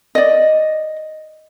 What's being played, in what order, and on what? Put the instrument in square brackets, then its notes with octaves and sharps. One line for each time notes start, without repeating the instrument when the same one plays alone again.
[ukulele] D5 D#5